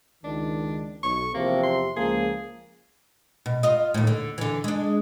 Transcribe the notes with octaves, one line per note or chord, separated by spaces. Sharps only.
C#2 D#3 D4
B1 C#6
E2 C3 F3 A#3
C6
C#2 F3 A#3 G#4
B2
F4 D#5
D#2 A2
D3
D3 E3
G#3 D4